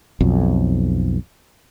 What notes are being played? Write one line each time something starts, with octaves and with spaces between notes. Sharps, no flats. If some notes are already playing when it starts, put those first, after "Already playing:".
B1 F2